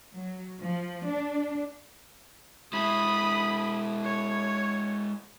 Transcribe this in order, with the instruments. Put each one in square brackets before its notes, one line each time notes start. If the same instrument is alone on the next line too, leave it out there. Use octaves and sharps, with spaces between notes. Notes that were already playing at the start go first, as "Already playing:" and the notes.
[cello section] F#3
F3
D4
[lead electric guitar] G#3 E4 [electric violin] B5 D#6
[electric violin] C#5